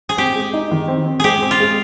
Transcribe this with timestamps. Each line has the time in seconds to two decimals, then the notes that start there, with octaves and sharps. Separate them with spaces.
0.09 G#4
0.17 C4 G4
0.35 G#3
0.54 D#4
0.71 D#3
0.88 C4
1.07 C4
1.20 G#3 G4 G#4
1.42 C4
1.51 F4
1.60 G#3